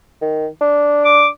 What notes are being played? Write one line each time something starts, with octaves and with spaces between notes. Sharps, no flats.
D#3
D4
D6